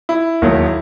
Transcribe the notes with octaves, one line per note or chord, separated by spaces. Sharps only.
E4
E1 D#2 D#3 F#3